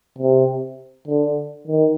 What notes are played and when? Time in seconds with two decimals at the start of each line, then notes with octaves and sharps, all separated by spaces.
0.18 C3
1.07 D3
1.67 D#3